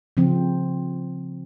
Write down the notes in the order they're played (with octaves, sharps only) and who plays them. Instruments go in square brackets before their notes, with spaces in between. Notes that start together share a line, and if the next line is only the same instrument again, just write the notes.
[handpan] C#3 F3 C4